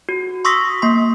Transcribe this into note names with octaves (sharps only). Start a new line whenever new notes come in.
F#4
C6 C#6 D#6 E6 A#6 B6
A#3 C6